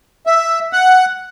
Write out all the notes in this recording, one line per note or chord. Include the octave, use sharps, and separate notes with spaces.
E5
F#5